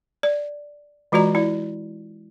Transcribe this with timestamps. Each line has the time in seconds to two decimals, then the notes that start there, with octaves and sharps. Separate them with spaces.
0.23 D5
1.12 E3 G#3 F4 F#4 D5 A#5
1.35 E4 D5